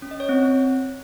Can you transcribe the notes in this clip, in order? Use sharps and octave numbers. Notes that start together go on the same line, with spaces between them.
C#4
D#5
C#5
C4